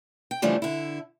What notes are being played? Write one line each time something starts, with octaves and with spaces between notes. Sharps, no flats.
G5
C#3 E3 F3 G3 A3 D4
D3 E4